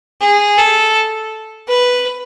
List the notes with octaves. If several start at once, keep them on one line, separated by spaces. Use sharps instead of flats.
G#4
A4
B4